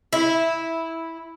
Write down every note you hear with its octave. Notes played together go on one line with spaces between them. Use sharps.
E4